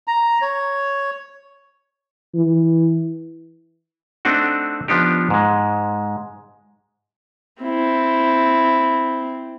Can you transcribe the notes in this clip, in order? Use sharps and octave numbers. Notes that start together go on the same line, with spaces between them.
A#5
C#5
E3
A3 C4 D4 D#4 F#4
F3 B3 D4 D#4 G4
G#2 G#3
C4 E4